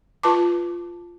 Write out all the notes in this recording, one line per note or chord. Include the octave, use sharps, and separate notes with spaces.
F4 B4 A5 D6